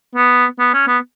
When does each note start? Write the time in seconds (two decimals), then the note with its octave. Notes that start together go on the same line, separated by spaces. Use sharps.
0.15 B3
0.59 B3
0.74 C#4
0.88 B3